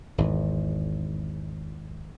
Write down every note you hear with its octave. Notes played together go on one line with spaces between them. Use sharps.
G#1 E2